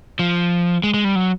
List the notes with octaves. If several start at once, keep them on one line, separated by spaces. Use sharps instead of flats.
F3
G#3
G#3
G3
F#3